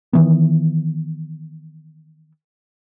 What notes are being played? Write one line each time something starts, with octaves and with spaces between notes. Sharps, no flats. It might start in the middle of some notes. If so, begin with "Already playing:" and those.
D#3 E3 B3